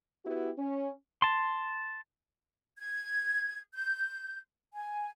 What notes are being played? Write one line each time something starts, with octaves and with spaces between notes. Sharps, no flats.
B3 E4 F#4 G4
C#4
A5 C6
G#6
G6
G#5